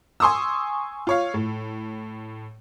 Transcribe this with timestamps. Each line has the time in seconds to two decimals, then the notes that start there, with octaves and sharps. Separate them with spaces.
0.20 G#5 C6 C#6 D#6 E6
1.07 F4 C#5 F5
1.34 A2